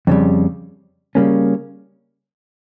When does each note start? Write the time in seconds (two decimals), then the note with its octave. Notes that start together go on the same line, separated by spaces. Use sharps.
0.07 F2 C#3 G3
1.15 C#3 G3 A#3 C#4